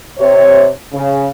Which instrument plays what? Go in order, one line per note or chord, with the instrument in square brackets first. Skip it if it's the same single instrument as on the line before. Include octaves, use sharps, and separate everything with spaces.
[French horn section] C3 C#5
C#3